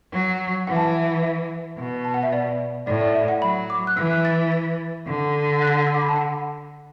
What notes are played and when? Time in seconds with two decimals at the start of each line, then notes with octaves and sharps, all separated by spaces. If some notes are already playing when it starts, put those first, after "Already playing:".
0.13 F#3
0.67 E3 F#5
0.76 A5
0.85 F#5
1.22 E5
1.78 B2
2.05 A5
2.14 F#5
2.23 E5
2.33 D5
2.87 A2 D5
3.01 D5
3.15 E5
3.28 F#5
3.42 F#3 B5
3.70 D6
3.87 F#6
3.97 E3 E6
4.10 F#6
4.25 A6
4.52 A6
5.07 D3
5.62 F#6
5.87 E6
5.94 D6
6.02 B5
6.09 A5
6.16 F#5